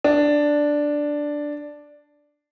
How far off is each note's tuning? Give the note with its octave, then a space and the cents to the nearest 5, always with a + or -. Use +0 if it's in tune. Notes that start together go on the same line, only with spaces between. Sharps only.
D4 +0